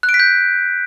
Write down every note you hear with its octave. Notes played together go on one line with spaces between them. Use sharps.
F#6
D7
B6
G6